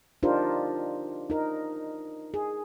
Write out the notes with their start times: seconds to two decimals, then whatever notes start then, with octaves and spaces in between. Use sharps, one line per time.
0.23 D4 D#4 F4 G4 A#4 C5
1.30 D#4 A#4
2.34 G#4